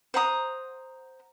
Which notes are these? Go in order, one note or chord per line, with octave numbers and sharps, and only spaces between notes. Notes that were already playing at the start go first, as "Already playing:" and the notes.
C5 F#5 A#5 D#6